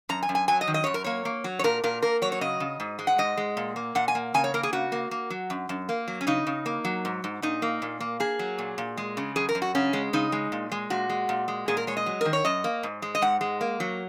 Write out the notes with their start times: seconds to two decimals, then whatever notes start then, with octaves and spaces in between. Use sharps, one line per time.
0.09 F#2 A#5
0.23 G#5
0.29 F#2
0.35 G#5
0.48 F#3 G#5
0.61 D#5
0.67 D#3
0.74 D#5
0.84 F#2 C#5
0.94 A#4
1.04 A#3 C#5
1.25 A#3
1.44 F#3
1.59 C#5
1.64 A#2 A#4
1.84 A#2 A#4
2.02 A#3 A#4
2.22 F#3 C#5
2.32 C#5
2.41 C#3 D#5
2.60 C#3
2.80 G#2
2.99 G#3
3.07 F#5
3.18 G#2 D#5
3.37 G#3
3.57 A#2
3.76 A#3
3.95 A#2 F#5
4.08 G#5
4.15 A#3
4.34 C#3 G#5
4.44 C#5
4.54 A#3 A#4
4.63 G#4
4.73 C#3 F#4
4.92 A#3
5.11 A#3
5.30 F#3
5.50 F#2
5.69 F#2
5.89 A#3
6.08 F#3
6.21 C#4
6.27 C#3 D#4
6.47 C#3
6.66 A#3
6.85 F#3
7.05 G#2
7.24 G#2
7.42 A#2 D#4
7.62 A#3
7.82 A#2
8.00 A#3
8.20 A#3 G#4
8.39 F#3
8.58 A#2
8.78 A#2
8.97 G#3
9.17 C#3
9.36 F#2 G#4
9.49 A#4
9.55 F#2
9.62 F#4
9.75 C#3 C#4
9.93 G#3
10.13 C#3 D#4
10.32 G#3
10.52 A#2
10.72 G#3
10.90 A#2 F#4
11.10 G#3
11.29 A#2
11.48 G#3
11.68 A#2 G#4
11.77 A#4
11.87 G#3 C#5
11.97 D#5
12.06 F#3
12.21 D#3 A#4
12.33 C#5
12.45 F#2 D#5
12.64 A#3
12.83 G#2
13.02 G#3
13.15 D#5
13.22 G#2 F#5
13.41 G#3
13.61 A#3
13.80 F#3